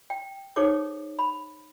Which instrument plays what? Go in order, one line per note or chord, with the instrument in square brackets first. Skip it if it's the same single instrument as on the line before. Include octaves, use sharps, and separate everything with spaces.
[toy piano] G5
D#4 G#4 A4 C5 C#5 D6
B5